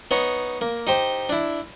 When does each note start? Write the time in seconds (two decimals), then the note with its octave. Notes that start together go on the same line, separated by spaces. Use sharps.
0.11 B3 D#4 C#5
0.61 A#3
0.87 D#4 G4 C5
1.29 D4 E4